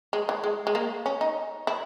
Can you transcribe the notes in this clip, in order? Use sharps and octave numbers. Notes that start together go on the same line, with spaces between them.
G#3
E3
G#3
G#3
A#3
C#4
D#4
E4